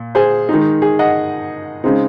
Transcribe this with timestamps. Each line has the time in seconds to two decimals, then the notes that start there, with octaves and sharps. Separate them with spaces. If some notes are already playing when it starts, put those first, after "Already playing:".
Already playing: A#2
0.15 G#4 C5
0.49 D#3 G#3 D#4
0.82 G#4
0.99 D#5 F#5
1.84 C#3 G#3 C4 D#4